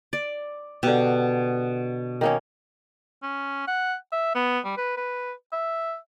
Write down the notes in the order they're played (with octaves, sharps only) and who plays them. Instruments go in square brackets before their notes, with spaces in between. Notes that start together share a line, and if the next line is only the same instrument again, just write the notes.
[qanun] D5
[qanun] B2 [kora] D3 G4
[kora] D#3 A#3 C#4
[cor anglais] C#4
F#5
E5
B3
G3
B4
B4
E5